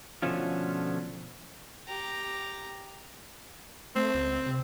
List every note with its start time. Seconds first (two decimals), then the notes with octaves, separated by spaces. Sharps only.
0.22 B2 D3 F3 A3 C#4 F4
1.87 G4 A#5
3.96 A3 C4
4.14 C#2
4.46 C3